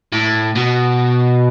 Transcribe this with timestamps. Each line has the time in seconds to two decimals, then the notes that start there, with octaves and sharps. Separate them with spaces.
0.13 A2
0.55 B2